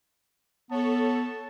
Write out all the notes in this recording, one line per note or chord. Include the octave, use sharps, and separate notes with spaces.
B3 A4 C#5 A5